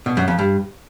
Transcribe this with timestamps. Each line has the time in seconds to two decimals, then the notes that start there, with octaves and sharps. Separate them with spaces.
0.06 B2
0.17 F#2
0.28 F2
0.39 G2